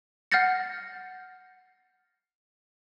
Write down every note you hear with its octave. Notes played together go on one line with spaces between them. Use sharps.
F#5 F6 G6 A6 A#6 C#7